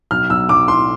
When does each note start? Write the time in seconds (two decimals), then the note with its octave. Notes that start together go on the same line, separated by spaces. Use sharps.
0.11 B1 F6
0.30 B1 E6
0.49 B1 D6
0.68 A2 C6